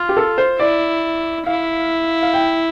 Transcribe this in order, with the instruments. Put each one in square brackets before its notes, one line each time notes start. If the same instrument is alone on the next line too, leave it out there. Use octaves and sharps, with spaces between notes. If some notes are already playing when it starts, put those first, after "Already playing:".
Already playing: [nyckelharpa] F4
[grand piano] G4
A4
C5
[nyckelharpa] E4 [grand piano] D5
[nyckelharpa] E4 [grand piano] F5
[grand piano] F5
G5